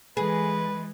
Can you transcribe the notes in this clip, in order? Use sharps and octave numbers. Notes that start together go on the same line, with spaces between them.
E3 G#3 G#4 B4